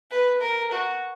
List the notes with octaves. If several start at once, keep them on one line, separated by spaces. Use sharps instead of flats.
B4
A#4
F#4